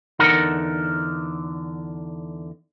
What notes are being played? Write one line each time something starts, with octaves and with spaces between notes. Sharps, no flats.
E2 D3 D#4 A#4 F#5